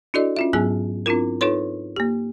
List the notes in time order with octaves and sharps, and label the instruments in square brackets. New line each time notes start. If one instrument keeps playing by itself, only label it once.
[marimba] D4 E4 F#4 A4 D5 D#5
C#4 F4 E5
G#2 F#3 B3 G#4 G#5 E6
C4 D4 E4 F4 A#4
D#4 F4 A4 B4 C#5 C6
A#3 G4